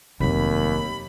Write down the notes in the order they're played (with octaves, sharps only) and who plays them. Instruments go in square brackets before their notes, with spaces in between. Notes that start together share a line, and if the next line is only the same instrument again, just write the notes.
[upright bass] F1 F#3 [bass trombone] D#2 [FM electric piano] C3 [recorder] B5